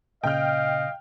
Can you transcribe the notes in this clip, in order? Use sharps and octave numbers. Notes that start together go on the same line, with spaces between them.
A#2 C#3 D#5 F5 G5 F6 G6